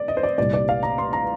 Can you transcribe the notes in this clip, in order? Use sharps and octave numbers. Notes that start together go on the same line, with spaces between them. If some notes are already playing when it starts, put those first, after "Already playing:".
Already playing: D5
D#5
C5
D5
C2 A#2 G3 D5
D5
F5
A#5
C6
A#5